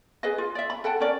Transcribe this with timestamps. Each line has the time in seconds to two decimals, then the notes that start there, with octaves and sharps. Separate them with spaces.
0.23 G#4 B4 D#5
0.38 F4
0.55 D5 E5
0.70 B5
0.84 A4 F#5 G5 A5
1.00 C#4 A#4 D5